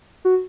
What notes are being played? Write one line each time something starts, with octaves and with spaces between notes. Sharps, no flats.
F#4